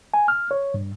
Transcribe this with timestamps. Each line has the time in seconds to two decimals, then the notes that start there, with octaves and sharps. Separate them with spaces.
0.14 G#5
0.28 F6
0.51 C#5
0.74 G2